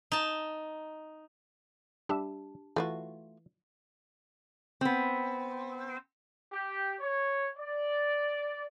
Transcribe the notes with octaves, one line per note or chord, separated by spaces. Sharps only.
D#4 A5
G3 D4 G4 E5 A5
E3 A3 F4 F#4
B3 C4
G4
C#5
D5